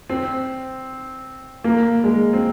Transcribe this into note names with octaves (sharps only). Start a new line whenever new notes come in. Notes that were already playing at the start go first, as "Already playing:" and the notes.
C4
A#3
G#3
C4